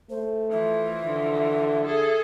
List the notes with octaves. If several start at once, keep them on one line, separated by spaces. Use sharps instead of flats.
A3 C5
E3 F3 E5
D3
G#4 A4